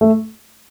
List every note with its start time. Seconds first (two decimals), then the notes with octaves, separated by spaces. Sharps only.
0.01 A3